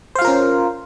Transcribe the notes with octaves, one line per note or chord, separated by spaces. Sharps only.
C#4 F4 A#4 C5 F5